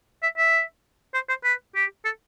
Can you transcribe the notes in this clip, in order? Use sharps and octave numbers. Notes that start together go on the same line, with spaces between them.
E5
E5
C5
C5
B4
G4
A4